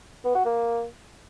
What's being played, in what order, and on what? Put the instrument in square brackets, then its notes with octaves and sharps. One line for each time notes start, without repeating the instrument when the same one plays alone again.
[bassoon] B3
F#4
A#3